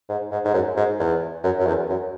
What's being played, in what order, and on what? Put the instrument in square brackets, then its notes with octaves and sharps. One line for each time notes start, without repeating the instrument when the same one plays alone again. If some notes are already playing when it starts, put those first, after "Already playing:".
[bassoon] G#2
G#2
G#2
F#2
G#2
E2
F#2
F#2
E2
F#2